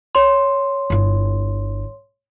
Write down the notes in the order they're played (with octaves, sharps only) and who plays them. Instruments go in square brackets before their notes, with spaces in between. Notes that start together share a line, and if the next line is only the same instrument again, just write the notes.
[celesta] C#5 C6
[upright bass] G1 E4